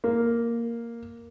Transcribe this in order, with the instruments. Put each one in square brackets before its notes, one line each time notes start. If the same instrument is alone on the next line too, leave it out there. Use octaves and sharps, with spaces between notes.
[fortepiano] A#3